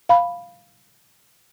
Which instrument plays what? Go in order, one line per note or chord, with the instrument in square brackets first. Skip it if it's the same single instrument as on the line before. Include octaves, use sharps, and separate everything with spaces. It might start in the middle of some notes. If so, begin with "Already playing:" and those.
[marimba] F5 B5